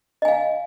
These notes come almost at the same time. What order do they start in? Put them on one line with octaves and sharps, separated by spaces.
D#5 G#5 F5